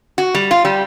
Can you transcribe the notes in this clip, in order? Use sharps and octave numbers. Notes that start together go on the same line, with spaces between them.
F#4
G3
F4
G3